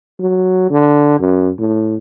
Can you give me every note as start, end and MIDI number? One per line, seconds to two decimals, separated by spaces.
0.20 0.66 54
0.70 1.18 50
1.20 1.49 42
1.59 1.96 45